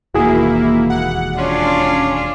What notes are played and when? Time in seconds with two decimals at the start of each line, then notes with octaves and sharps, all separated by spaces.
0.14 E1 D#2 A#3 E4 F#4 G#4
0.90 F#5
1.38 C#4 D4 F4